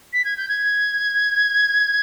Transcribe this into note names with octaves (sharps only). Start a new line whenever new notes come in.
B6
G#6
G6
G#6